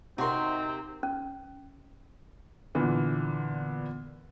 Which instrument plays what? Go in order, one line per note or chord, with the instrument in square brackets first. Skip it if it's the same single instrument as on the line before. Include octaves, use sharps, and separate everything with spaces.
[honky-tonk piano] C3 A#4 [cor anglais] C4 [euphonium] D#4 [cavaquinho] F#4 C#5 C6
[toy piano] C#4
[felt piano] A#2 D3 E3 B3